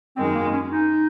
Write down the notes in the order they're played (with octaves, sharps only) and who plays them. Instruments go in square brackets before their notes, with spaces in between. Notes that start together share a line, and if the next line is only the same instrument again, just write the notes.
[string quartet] F#2 D#3 G#3 [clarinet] C4
[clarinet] A#3
C#4
D#4